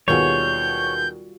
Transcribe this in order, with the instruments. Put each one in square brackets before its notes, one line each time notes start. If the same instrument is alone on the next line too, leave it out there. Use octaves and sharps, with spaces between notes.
[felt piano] D#2 B2 G#4 [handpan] G3 F4 F#4 [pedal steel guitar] C#5 [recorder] G6